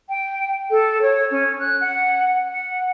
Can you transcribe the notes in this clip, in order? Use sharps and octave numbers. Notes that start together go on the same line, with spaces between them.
G5
A4
C#5
C#4
F#6
F#5
F#5